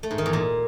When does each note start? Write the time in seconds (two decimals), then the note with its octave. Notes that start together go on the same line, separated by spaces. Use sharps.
0.03 A3
0.11 G#2
0.18 D#3
0.26 E2
0.33 A#2